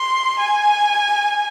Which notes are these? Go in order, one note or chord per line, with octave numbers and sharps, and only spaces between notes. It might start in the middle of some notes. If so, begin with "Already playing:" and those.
Already playing: C6
G#5